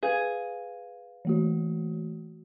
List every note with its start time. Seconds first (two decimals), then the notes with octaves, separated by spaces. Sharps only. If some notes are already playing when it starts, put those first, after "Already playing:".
0.03 G#4 B4 F5
1.25 E3 A3 F#4